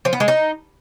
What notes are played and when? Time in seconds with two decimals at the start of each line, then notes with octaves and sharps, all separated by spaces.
0.05 F3
0.13 B3
0.20 G#3
0.28 D#4